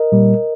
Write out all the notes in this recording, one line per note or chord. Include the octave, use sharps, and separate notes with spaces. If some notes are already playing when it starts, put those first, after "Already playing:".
Already playing: A#4 D#5
A#2 G3